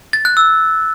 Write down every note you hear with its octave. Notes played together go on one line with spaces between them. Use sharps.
A6
F#6
E6